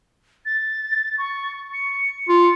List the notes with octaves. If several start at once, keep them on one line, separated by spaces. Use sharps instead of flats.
A6
C#6
C#7
F4